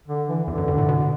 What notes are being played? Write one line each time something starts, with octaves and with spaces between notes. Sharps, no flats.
D3
E3
E2 D3
F#2
G2
A2
B2